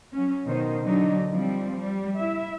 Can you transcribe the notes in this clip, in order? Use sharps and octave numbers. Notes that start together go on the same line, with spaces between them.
F#3 C#4
B2 D#3 D#4 C5
D3 F#3 D4 D#4
F3 G3 C4
G3
E4 E5